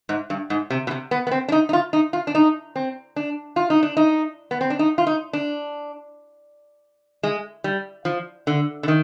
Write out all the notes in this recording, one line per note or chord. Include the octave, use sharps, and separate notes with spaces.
G#2
G2
G#2
C3
B2
C3
B3
B3
C4
D4
D#4
D#4
F4
D#4
F4
D4
D#4
C4
D4
F4
D#4
D4
D#4
B3
C4
D4
D#4
F4
D#4
D4
G#3
G3
F3
D3
D3
D#3